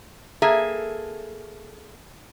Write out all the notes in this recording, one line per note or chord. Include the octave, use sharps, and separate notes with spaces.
A#3 G#4 A4 E5